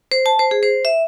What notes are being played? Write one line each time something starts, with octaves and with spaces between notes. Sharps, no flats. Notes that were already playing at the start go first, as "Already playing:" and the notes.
C5
A5
C5
G#4
C5
E5